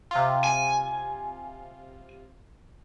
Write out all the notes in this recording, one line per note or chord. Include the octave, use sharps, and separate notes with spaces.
C3 F4
G#5